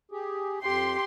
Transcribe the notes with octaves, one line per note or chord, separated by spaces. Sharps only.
G4 G#4
F2 G4 C6